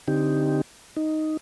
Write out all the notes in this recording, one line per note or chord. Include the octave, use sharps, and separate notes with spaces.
D3 C4 D#4 G4
D#4